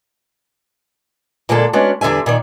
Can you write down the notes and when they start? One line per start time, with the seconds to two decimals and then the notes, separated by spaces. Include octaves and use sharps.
1.49 A#2 D3 G#3 A#3 D4 A4
1.73 G#3 B3 C#4 D4 F#4
2.01 E2 D3 G3 E5 G#5
2.26 A#2 D#3 D5